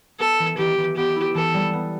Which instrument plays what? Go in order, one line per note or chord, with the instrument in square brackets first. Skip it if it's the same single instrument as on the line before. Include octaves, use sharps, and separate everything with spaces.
[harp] B3 [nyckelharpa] A4
[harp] E3
[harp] E3 [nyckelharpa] G4
[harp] E3
[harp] B3 [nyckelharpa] G4
[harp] E4
[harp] E3 [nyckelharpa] A4
[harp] G3
B3